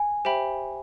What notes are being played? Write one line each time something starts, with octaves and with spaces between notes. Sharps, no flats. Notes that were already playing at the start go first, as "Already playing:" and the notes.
Already playing: G#5
G4 C5 E5 G5 B5